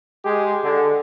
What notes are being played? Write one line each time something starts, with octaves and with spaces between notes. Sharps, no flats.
G#3 G4 G#4
D3